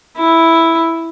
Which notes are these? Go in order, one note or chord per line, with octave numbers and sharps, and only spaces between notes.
E4